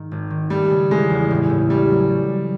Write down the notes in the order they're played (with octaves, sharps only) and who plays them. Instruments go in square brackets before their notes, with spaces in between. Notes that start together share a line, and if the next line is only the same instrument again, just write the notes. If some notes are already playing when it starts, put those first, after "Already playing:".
Already playing: [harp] G#2 D#3
G#1
D#3
[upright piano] G3 [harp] A3
[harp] C#3
[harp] E3 [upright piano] G#3
[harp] E2
A2
A2
[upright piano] G3 [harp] C#4
[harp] F#3
G3
G3